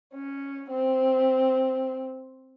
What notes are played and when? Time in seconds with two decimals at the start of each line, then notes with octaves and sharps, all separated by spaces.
0.14 C#4
0.71 C4